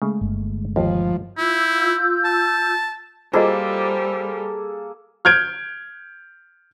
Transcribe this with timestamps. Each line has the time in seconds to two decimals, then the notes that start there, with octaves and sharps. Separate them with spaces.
0.02 C#3 G#3 A3
0.21 G1
0.76 D#2 F3
1.38 E4 F4 E6 G6
2.24 A5
3.33 G3 A#3 F4 F#4 G#4 A4 C5 D#5
5.25 F6 G6 G#6 D7